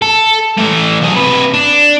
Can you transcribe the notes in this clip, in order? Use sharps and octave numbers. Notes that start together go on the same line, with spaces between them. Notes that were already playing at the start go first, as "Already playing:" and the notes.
A4
E3 A3
B1 G#4
C3 B4
D4